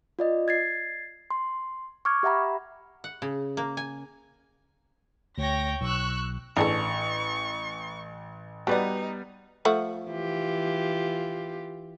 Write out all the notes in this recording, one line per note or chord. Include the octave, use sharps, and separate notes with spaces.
F4 D5 D#5
G#6 A6 C7
C6
C#6 D6 F6 G#6
G4 E5 F#5 A#5 B5
F#5
C#3
A#3
G#5
D2 C#5 G5 A#6
B1 C#6 E6 F#6
A1 D4 G#4 A4 C#6
G3 B3 D#4 F#4 B4 D5
F3 A3 F#5
E3 F4 G4